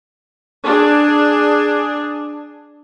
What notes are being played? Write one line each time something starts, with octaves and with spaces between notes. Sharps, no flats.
D4 G#4